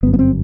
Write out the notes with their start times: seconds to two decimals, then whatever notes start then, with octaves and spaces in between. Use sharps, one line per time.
0.03 G1 B3
0.07 F#2
0.13 B3
0.19 C4